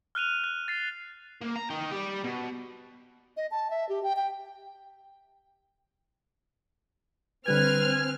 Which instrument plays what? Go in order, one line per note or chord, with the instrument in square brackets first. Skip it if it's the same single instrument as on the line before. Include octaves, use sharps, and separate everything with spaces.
[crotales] F6 F#6 D#7 F7
F#6
A6 C7
[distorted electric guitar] A#3
A#5
D#4 G5
G3 G4
B2
[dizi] D#5
A5
E5
G4
G5
G5
[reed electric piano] D3 G3 G#6 [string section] C4 F6 [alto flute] B4 [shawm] G#5